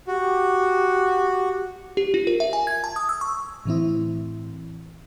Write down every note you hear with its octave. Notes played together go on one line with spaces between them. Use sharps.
F#4 G4
G4
F4
A#4
E5
G#5
G#6
A5
D#6
E6
C#6
A2 E3 C4 E4